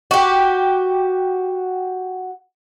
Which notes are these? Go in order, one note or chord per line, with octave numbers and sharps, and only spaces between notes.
F#4 G4